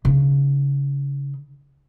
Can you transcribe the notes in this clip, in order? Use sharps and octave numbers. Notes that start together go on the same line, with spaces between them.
C#3 D#4